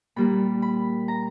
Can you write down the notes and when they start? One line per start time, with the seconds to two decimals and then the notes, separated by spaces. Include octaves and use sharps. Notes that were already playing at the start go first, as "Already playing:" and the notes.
0.16 A#2 G3 A#3 B5
0.62 B5
1.08 A#5